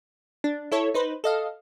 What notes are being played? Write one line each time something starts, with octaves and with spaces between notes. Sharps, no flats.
D4
E4 A4 C#5
D#4 B4 C5
A4 D#5 F5